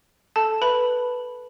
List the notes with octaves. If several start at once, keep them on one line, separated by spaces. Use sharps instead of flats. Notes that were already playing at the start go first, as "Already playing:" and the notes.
A4 A5
B4 B5